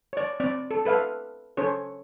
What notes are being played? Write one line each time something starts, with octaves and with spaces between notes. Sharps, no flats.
C#5 D5
C4 D5
A4
A4 B4 E5 F5
C#4 A4 C5 C#5